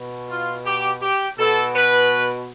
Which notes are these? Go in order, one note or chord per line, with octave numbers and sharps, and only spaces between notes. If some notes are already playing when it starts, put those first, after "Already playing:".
Already playing: B2
F4
G4
G4
B2 A4
B4